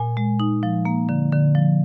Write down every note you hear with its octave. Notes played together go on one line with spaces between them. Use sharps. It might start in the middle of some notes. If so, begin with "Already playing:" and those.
Already playing: A#2 G#5
G#3
D#4
F3
A#3
D3
D3
F3